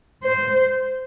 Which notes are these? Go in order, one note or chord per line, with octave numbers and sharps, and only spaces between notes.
C5